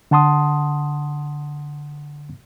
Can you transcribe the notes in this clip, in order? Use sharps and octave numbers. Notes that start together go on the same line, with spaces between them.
D3 F#5 A5 C6 D#6